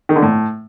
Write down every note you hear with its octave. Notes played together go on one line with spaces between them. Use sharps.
D#3
D3
A2